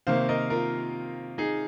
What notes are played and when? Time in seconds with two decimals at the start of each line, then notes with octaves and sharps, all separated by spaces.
0.07 C3 D#3 A#3 C5 F5
0.29 A#4 D#5
0.50 F4 A#4
1.38 D#4 G#4